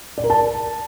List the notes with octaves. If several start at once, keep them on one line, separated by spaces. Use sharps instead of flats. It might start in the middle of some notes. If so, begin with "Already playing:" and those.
D5
A#4
A5